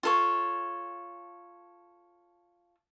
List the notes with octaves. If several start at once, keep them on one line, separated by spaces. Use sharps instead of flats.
F4 A4 C#5